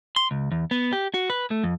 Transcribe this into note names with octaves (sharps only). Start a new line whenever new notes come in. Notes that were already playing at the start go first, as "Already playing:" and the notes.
C6
C#2
E2
B3
G4
F#4
B4
A3
F2